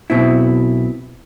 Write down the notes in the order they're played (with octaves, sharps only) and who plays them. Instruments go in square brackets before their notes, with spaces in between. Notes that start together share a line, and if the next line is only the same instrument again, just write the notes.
[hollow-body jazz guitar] B1 B2 C4 E4